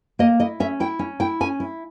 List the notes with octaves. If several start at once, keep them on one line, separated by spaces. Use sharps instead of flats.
A#3 D#5
E4 D#5
C#4 E5
E4 G5
C#4
E4 G5
C#4 G#5
E4